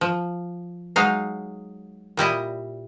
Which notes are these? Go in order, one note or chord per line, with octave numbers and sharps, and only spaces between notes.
F3
F#3 G#3 D#4 F5
A#2 G3 E4 D#5